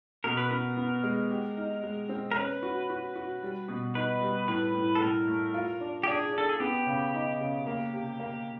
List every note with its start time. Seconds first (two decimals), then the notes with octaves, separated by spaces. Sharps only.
0.24 B2 A#4
0.37 B4
0.51 B3 A#4
0.77 B3
1.03 G#3
1.30 G4
1.57 D#4
1.83 G#3
2.09 C4
2.32 A#4
2.36 C#4 B4
2.63 F#4
2.90 F#4
3.16 F#4
3.42 G3
3.68 B2
3.95 D#4 B4
4.21 G3
4.48 A2 B4
4.74 A2
4.95 A4
5.01 A2 A#4
5.28 A3
5.54 F4
5.81 D4
6.03 G4
6.08 D4 G#4
6.33 D4 A4
6.49 G#4
6.60 B3 G4
6.86 C#3
7.14 D#4
7.40 C#3
7.66 A#3
7.93 C3
8.20 A#3